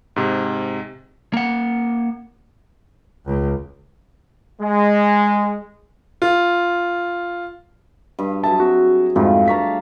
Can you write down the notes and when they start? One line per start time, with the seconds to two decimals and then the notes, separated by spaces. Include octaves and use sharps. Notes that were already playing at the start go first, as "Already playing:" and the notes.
0.16 G#2 C3
1.34 A#3 F#5
3.26 C#2
4.61 G#3
6.22 F4
8.19 G2 D#5
8.44 F#3 G#4 E5 A5
8.60 C4 F#4
9.16 F2 G#2 F3 G3 A3
9.48 D4 F5 A5 A#5 C#6 B6